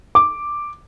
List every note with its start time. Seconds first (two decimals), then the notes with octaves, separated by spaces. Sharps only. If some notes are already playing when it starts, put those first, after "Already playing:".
0.15 D6